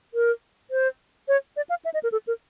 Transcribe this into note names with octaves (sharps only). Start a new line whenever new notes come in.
A#4
C5
C#5
D5
F5
E5
D#5
A#4
A4
A#4